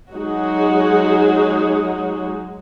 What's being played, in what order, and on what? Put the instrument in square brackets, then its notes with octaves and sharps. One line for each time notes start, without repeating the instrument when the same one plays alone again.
[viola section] F#3 G#3 D#4 F#4 G#4